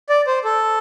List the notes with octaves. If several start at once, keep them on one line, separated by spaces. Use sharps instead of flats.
D5
C5
A4